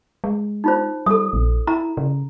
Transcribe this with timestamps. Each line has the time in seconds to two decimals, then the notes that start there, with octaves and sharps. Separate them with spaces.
0.24 G#3
0.64 D#4 F4 C5
1.06 G3 A4 D#6
1.33 A#1
1.67 E4 A#5
1.97 C#3